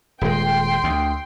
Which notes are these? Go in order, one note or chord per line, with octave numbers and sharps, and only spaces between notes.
D#1 G#3 G5 C6
D2